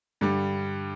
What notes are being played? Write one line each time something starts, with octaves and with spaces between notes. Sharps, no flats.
G2 D3 G3